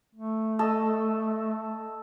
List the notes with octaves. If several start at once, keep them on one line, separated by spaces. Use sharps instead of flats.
A3
A4 D#5